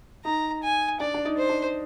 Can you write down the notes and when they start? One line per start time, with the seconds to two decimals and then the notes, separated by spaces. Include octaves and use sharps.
0.25 D#4 A#5
0.63 G#5
1.00 D4 D5
1.14 D4
1.25 D#4
1.38 C5
1.50 D4